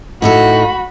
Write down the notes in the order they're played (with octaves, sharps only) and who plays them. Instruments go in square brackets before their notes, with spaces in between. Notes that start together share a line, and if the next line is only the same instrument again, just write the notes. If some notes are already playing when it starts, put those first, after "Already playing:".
[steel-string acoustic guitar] A2 D#4 A4 [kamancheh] F#4 B5